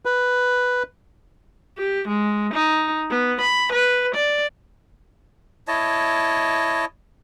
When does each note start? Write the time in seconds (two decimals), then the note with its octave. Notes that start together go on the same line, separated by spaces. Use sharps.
0.05 B4
1.78 G4
2.08 G#3
2.54 D#4
3.10 B3
3.41 B5
3.72 B4
4.15 D5
5.68 E4 C#5 D#5 A5